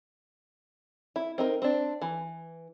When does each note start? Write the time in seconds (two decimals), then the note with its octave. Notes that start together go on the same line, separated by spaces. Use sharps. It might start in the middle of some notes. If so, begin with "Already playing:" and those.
1.16 E4
1.38 C4 D#4 A#4
1.62 C4 D4
2.02 E3